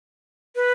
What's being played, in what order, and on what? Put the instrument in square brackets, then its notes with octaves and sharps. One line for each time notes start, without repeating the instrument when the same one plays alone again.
[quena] B4